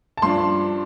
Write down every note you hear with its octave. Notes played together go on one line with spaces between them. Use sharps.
A5
G2 F3 D4 C6